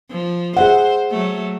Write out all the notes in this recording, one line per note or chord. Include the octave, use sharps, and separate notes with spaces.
F3
G#4 C5 E5 F#5
F#3 A3